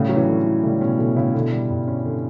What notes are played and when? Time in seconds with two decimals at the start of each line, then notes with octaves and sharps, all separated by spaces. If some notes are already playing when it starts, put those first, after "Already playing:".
Already playing: A2 C#3 G3
0.09 F#3 C#4
0.16 C#3 E3
0.29 D3
0.46 E4
0.63 A2 C#3 G3
0.81 B2 C#4
0.99 B2 D3
1.16 A2 C#3 E4
1.34 B2 D3
1.52 G3
1.70 G2
1.88 C#4
2.05 D3